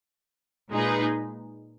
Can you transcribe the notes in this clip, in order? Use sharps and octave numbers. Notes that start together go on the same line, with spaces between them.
A#2 G#3 D#4 G#4 B4